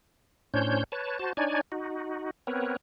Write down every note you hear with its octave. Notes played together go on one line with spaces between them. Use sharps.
A2 C#4 D4 C5 C#5 G6
B4 C#5 A5
F#4 C5 A5
D4 D#4 C#5 D5 G#5
D#4 F#4
B3 C4 A#4 B4 C#5